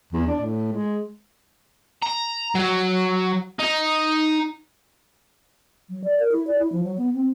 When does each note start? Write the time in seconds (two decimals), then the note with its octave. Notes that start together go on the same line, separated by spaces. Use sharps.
0.13 E2
0.27 D4
0.40 A2
0.72 G#3
2.03 A#5
2.55 F#3
3.59 D#4
5.89 F#3
6.04 D5
6.20 A#4
6.32 E4
6.47 D5
6.59 E4
6.72 F3
6.84 F#3
6.98 B3
7.15 C4